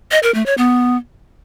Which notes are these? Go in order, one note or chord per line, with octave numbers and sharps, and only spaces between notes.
D#5
A#4
A3
C#5
B3